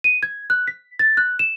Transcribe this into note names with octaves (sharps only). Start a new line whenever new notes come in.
D#7
G#6
F#6
B6
A6
F#6
E7